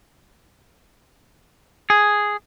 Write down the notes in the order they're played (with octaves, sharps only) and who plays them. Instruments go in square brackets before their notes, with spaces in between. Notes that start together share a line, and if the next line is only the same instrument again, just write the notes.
[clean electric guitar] G#4